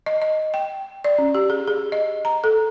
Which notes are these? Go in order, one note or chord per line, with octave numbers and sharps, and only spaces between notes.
D#5
D#5
G5
D5
C#4
G4
G#4
G#4
D#5
A#5
A4